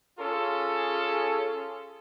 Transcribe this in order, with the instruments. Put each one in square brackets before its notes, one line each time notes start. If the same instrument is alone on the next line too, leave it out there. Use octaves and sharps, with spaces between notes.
[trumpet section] C#4 F4 G#4 A4